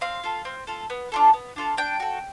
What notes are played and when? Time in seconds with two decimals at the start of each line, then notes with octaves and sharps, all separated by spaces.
0.01 C4 F5
0.24 F4 A4
0.45 C4
0.67 F4 A4
0.90 B3
1.12 D4 F4 A4
1.33 B3
1.56 D4 F4 A4
1.77 D4 G5
2.00 F#4 A4